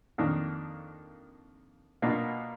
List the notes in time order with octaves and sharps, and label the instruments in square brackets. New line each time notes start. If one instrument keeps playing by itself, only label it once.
[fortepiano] F2 D#3 A#3 D4
B2 A#3 D4 F4 A#4